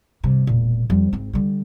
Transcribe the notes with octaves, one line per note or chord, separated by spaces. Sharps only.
G2 C3
E1 A#2
F2 G3
G#1 C4
D3 G3